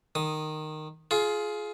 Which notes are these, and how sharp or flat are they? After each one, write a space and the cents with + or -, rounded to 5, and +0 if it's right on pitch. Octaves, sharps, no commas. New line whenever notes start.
D#3 -10 D#6 +0
F4 +0 G#4 +25